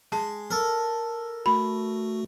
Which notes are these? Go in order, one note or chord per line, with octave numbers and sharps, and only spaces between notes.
G#3 A5
A4 A#4
A3 F#4 B5